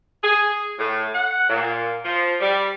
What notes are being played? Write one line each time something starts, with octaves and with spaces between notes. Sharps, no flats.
G#4
A2
F#5
A#2
F3
G3